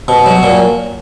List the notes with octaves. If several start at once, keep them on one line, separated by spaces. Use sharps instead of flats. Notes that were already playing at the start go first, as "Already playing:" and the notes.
B2
F#3
A#2